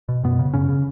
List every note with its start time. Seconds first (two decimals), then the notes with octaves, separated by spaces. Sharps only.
0.09 B2
0.24 F#2 B2 B3
0.39 C#3
0.54 F#2 C#3 C#4
0.69 C#3